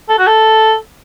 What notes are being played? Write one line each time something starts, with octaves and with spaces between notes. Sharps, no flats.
A4
F#4
A4